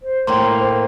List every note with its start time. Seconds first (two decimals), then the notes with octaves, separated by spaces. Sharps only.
0.03 C5
0.27 A2 A#3 G5 C6